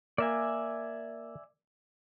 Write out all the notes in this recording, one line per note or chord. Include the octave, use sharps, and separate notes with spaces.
A#3 D5 E5 G#5